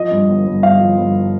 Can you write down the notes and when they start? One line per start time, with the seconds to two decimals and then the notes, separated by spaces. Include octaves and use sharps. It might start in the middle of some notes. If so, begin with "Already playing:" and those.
Already playing: F3 D#5
0.11 G2
0.28 G1
0.46 G1
0.63 G1 F5
0.80 F3
0.97 G1